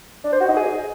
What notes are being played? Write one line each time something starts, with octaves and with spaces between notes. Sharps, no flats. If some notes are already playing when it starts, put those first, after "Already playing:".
D4
C5
F#4
D#4
G#4